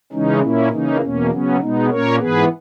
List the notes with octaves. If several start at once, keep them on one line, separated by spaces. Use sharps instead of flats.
C#3 E3 G#3 C#4 D#4
A#2 A#3 C#4 E4
C#3 E3 A#3 C#4 D#4
E2 B2 A#3 C#4
C#3 F#3 B3 C#4
B2 G#3 B3 D#4
A#2 A#3 C#4 A#4 C#5
G#2 E3 B3 G#4 B4